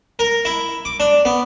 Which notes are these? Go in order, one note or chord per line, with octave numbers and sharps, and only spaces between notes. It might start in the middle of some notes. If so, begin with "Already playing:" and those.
A#4
E4
D6
D4
B3